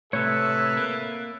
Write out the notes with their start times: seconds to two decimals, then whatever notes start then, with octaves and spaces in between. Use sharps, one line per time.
0.13 A2 C3 A4 B4 C#5 E5
0.77 A#3